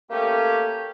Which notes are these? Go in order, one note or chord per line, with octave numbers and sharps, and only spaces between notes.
A3 A#3 C#4 G4